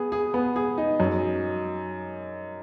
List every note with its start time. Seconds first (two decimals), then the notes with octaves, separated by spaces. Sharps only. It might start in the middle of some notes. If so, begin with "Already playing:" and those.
Already playing: B3 G#4
0.12 G#4
0.34 B3
0.56 G#4
0.78 D#4
1.00 F#2